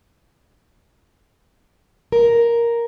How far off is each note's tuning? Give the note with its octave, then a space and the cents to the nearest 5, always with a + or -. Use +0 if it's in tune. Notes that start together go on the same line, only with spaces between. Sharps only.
A#4 +5